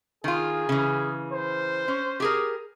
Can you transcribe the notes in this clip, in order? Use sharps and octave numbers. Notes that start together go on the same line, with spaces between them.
D#3 F4 G#4
C#3 E3
C5
C#4
G4 G#4 A#4